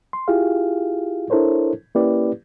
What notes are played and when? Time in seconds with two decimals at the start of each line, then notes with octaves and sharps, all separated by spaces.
0.13 C6
0.28 E4 F4 G4 G#4 F5
1.30 D4 E4 A4 A#4 C5 C#5
1.95 A#3 C#4 E4 G4 B4 D5